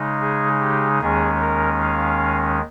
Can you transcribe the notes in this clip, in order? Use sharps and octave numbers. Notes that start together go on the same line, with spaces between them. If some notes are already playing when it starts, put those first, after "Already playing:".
Already playing: C#3 G#3 D#4
G#4
G4
D#2 D#3 G#3 C#4 G#4
A#4
F5